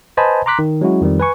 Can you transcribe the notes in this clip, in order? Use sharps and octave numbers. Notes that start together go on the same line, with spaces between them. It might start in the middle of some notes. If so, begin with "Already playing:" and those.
B4 C5 D#5 G#5 A5 B5
A#5 C6 D6 F#6 B6
D#3
F#3 G#3 C#4 E4 F#4
F2 D#3 F3 G3
B4 G#5 C#6